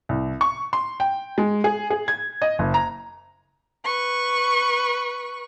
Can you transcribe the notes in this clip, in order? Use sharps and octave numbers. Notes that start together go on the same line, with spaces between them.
C2
C#6
C6
G5
G#3
G#4
G#4
G#6
D#5
F#1
A#5
B4 C#6